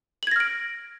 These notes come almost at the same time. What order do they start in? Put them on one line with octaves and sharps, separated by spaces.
F#7 G#6 A#6 F6 D7